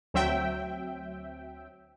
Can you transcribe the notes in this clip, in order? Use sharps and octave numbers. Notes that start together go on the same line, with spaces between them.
D2 F#3 C4 E5 G5